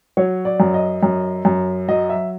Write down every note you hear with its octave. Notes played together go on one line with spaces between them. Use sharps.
F#3 C#5
D5
F#2
D#5
F#2
F#2
F#3 D#5
E5